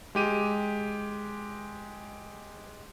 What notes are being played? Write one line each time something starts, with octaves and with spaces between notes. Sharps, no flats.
G#3 G4 D#7